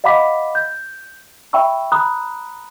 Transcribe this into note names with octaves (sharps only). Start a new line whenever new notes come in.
D#5 F5 F#5 B5 D6 B6
G6
E5 G5 B5 C#6 E6
A#5 B5 D#6 F#6